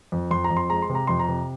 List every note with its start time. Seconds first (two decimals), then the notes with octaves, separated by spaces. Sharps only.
0.12 F2
0.31 F2 C6
0.44 A#5
0.51 F2
0.57 C6
0.70 G#3 A#5
0.82 C6
0.90 C3
0.95 A#5
1.07 F2 C6
1.19 A#5
1.28 C3